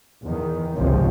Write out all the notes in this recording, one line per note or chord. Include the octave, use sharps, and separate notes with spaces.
E2 D#3
G#1 C#2 C3 F3 C#4